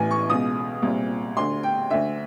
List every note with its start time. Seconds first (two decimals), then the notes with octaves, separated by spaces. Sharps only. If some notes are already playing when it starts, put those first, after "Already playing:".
Already playing: A1 A2 E3 G#5
0.11 C#6
0.29 C#2 B2 D#6
0.82 C2 A#2
1.37 D2 D3 C6
1.63 G5
1.90 D2 D3 E5